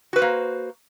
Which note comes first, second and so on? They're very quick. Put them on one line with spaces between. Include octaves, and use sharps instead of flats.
F#4 B4 C5 A#3